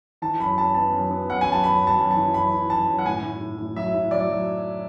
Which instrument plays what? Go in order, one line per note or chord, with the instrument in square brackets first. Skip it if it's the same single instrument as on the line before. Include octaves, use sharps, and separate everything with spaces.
[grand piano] E3 A5
F#2 B5
F#2 A5
B3 A5
F#2
B3
F#2 F#5
F#2 G#5
A5
F#2 B5
F#2
A5
F#2
A5
E3
F#2 B5
E3
F#2 A5
F#2
F#5
A2 G#5
A2
A2
A2
F#3 E5
A2
F#3 D5
F#3